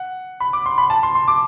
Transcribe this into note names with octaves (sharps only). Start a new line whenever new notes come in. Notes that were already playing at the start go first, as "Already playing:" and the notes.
Already playing: F#5
B5
D6
C6
B5
A5
C6
C6
D6